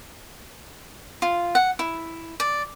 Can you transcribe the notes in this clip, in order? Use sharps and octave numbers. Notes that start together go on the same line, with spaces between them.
F4
F#5
E4
D5